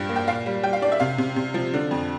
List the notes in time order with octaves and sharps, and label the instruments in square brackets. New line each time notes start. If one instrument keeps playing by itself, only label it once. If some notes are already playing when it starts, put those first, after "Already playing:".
Already playing: [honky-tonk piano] G2 F3 G5
A#3
G5
A#2 F5
G3
G3 G5
F5
D4 D5
E5
C3 F5
C3
C3
F3
D3
F2